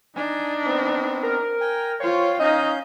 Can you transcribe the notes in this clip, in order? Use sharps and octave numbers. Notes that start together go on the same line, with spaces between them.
D4 D#4 G#5
B3 C4
A#4
G5 G#5
F4 C5 C#5 F5 G5
C#4 D#4 D#5 F5 G6